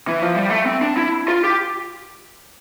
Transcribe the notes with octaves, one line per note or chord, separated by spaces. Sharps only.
E3
F3
G3
A3
C4
D4
E4
F4
G4